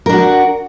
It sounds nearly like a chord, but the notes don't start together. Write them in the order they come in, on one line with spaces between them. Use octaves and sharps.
A#4 D4 F#4